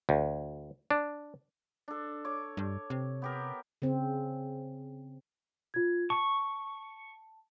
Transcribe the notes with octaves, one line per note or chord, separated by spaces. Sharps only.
D2
D4
D4 A4
C#5 D6
G2
C3
B3 G4 A#4
C#3 C4
F4 G#6
A5 C#6